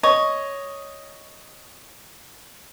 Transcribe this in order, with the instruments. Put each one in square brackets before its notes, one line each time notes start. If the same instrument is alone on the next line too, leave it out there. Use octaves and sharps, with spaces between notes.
[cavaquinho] C#5 [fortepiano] D#5